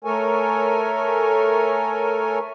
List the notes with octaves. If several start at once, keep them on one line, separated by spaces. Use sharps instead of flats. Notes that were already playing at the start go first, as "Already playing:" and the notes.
A3 A4 A#4 C#5 G#5